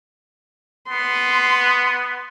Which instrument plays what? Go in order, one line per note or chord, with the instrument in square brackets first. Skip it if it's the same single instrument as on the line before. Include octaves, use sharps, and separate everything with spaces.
[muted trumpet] B3 [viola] C6